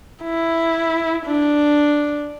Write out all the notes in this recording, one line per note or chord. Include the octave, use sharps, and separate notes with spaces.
E4
D4